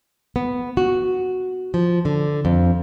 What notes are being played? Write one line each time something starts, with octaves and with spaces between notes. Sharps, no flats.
B3
F#4
F3
D3
F2